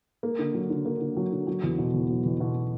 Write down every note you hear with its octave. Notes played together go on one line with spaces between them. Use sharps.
A#3
D3
F#3
D3
A#3
D3
F#3
D3
F#3
E2
B2
E2
F#3
E2
B2